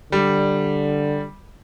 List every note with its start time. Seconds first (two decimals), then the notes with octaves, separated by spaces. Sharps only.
0.12 D3 G3